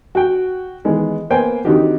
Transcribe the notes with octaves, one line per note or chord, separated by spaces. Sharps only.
F#4 G5
D#3 E3 G#3 B3
A#3 B3 C5 G5 G#5
D3 D#3 C4 D#4 F#4 G4